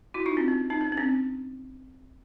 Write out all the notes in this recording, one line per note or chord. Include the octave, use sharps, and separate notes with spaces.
E4 F#4
D#4 F4
C4 D4
C#4
C#4 D#4
C#4
C#4
C4 D4